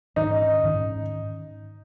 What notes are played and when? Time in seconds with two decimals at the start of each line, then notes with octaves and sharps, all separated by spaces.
0.16 G#2 D#3 C#4 D#4
0.64 G#2 D#3 C#4